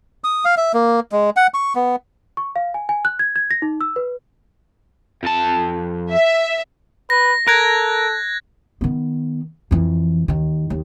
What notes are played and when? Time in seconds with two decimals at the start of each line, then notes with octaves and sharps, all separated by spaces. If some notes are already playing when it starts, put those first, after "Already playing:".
0.24 D#6
0.45 F5
0.57 E5
0.74 A#3
1.12 G#3
1.36 F#5
1.54 C#6
1.76 B3
2.37 C#6
2.56 F5
2.74 G#5
2.89 G#5
3.05 F#6
3.19 G#6
3.36 G#6
3.51 A#6
3.62 D#4
3.81 E6
3.96 B4
5.23 F2 A5
6.11 E5
7.10 B4 A#6
7.47 A4 A#4 F#6 G#6
8.81 D#3 B3
9.71 F2 E3
10.28 D#2 D#3
10.70 D#2